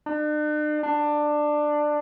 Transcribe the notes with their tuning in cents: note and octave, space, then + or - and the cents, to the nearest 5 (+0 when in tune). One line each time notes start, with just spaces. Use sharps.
D4 +45
D4 +15